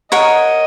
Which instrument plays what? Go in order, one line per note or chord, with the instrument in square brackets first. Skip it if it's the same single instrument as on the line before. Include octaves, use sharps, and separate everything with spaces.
[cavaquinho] A#4 C#5 F#5 [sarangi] D#5